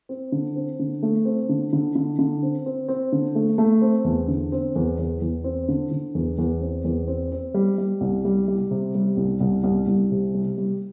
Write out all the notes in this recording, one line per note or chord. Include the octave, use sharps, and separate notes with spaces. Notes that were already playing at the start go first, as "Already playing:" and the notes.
C4
D3
C4
D3
A3
C4
D3
D3
D3
D3
C4
C4
C4
D3
A3
A3
C4
E2
D3
C4
E2
E2
E2
C4
D3
D3
E2
E2
C4
E2
C4
C4
G3
G3
C2
G3
G3
C3
G3
C2
C2
C2
C2
C3
G3
G3